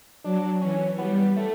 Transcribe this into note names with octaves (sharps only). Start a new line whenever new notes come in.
F#3 D4
E3 C#4
G3 B3
A3